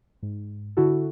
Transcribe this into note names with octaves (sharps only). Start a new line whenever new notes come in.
G#2
D3 E4 F#4 A4